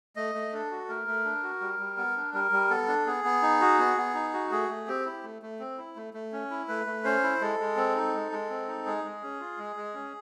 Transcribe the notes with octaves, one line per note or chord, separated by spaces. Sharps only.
A3 D#5
A3
D4 A4
F#4
A3 A#4
A3
D4
F#4
G3
G3
B3
D4
G3 A#4
G3
B3 A4
D4
B3 G#4
B3
D#4
F#4
B3
B3
D#4
F#4
A3 G#4
A3
C4 G4
E4
A3
A3
C4
E4
A3
A3
C#4
E4
A3 B4
A3
C#4 C5
E4
G#3 A4
G#3
C4
D#4
G#3
G#3
C4
D#4
G#3 G#4
G#3
C#4
F4
G#3
G#3
C#4